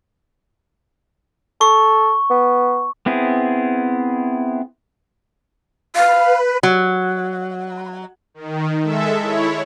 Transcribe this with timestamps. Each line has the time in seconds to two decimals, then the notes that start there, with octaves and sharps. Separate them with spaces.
1.61 A4 C#6
2.31 B3
3.06 B3 C4 E4 G#4
5.96 B4 F5
6.63 F#3
8.34 D#3
8.82 G#3 A4 E5
9.19 E4 C#5